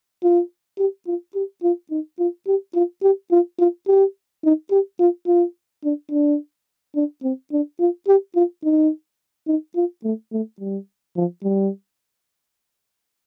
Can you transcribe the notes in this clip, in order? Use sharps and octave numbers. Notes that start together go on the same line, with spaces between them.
F4
G4
F4
G4
F4
D#4
F4
G4
F4
G4
F4
F4
G4
D#4
G4
F4
F4
D4
D4
D4
C4
D4
F4
G4
F4
D#4
D#4
F4
A3
A3
G3
F3
G3